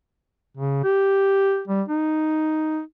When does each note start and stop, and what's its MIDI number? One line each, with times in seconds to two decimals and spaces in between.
0.57 0.80 49
0.84 1.62 67
1.68 1.82 55
1.89 2.81 63